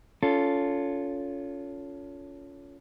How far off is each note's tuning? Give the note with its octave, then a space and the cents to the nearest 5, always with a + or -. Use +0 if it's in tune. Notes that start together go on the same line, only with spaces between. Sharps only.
C#4 +25 F4 +0 A4 +0